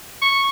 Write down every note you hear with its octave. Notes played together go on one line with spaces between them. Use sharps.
C#6